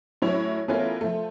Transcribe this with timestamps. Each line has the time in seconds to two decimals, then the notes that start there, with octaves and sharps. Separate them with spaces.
0.22 A2 F#3 C#4 E4 C#5 F7
0.68 E3 A3 B3 C#4 F4 A#4
1.01 F3 A3